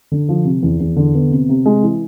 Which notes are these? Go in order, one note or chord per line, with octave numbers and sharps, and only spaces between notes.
D3
F3
C3
E2
E2
D3
B3
C3
C3
G#3
E3